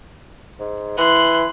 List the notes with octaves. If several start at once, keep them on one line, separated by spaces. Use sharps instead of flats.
G#2
E3 C6 F#6